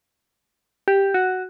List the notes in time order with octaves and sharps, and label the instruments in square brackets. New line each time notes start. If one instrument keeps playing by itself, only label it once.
[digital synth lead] G4
F#4